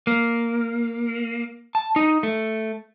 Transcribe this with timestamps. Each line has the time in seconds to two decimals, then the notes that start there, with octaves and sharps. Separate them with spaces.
0.07 A#3
1.75 A5
1.96 D#4
2.23 A3